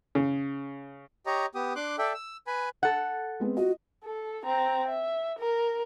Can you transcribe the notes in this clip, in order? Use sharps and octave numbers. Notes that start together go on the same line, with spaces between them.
C#3
G4 C#5 D#5 A#5
B3 G4 D#6
D4 C6 D6 F#6
A4 D5 E5 G5
E6
B4 G#5 B5
A4 F#5
G#3 B3 C4
F4 F#4 D#5
A4
C4 A#5
E5
A#4